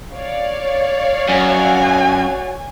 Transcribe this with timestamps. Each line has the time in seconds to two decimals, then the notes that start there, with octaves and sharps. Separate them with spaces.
0.15 C#5 D5 F5
1.29 F#2 F#4 G#5